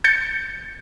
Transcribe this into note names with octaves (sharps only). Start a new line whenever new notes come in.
G6 A6 C#7